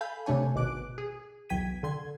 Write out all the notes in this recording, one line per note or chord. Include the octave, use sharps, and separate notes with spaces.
A4 F5 G#5 B5 G6
C3 A3 D4 C#5 G#5
G#1 B2 D6 F#6 D7
G#4
B1 E2 G5 G#6 B6 D#7
D3 C6 G#6